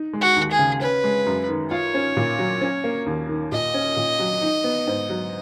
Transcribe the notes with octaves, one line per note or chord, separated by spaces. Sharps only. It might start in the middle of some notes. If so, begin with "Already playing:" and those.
Already playing: D#4
G#3
F#4
D#2
G#4
C#3
C#4 B4
G#3
F#2
D#3
F4 C#5
C#4
A#2
F#3
C#4
A#3
D#2
D#3
A#2 D#5
C#4
A#2
F#3
D#4
B3
G#2
F#3